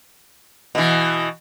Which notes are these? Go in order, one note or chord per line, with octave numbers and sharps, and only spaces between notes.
B2 E3